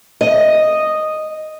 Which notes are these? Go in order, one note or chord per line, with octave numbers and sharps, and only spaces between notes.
D#5